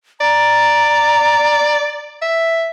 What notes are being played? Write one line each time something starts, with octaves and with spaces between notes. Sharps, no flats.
D5 A#5
E5